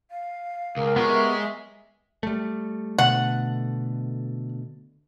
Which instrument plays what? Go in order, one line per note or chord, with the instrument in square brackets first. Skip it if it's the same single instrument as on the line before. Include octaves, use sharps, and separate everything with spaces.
[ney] F5
[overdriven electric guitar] C#2 [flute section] A#4
[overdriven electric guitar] G#3 [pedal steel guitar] B3 G4 C#5 [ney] F4
[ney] E5
[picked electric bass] G3 A3
[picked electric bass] B2 D3 A3 [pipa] F#5